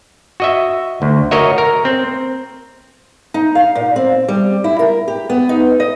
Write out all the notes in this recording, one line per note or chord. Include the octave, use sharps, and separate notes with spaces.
F#4 D#5 E5
D2
F#4 A#4 C#5 D#5 E5
A#4
C4
D#4
F5
A#2
C4
G3
E4
A#4
G4
B3
D#4
D#5